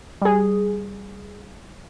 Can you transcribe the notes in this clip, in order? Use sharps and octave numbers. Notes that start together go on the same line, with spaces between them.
G3 G#4